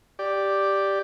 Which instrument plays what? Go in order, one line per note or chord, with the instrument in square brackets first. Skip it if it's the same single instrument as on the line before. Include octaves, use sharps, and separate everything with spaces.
[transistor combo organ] G4 D5